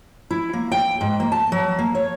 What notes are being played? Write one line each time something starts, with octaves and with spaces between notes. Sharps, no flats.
E4
A#3
G5
G#2
A#3
A5
F#3
A#3
C#5